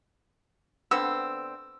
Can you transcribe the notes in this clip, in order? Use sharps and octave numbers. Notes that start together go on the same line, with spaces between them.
D3 B3 C4 E6